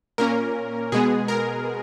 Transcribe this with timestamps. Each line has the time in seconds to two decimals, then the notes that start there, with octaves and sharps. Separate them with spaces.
0.18 A#2 A#3 C#4 A#4
0.92 B2 G#3 B3 G#4
1.28 A#4